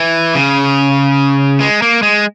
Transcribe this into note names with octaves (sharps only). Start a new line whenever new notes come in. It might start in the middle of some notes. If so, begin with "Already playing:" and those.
Already playing: E3
C#3
G#3
A#3
G#3